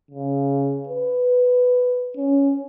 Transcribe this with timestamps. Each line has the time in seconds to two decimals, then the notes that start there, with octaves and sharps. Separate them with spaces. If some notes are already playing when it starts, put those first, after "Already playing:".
0.11 C#3
0.88 B4
2.17 C#4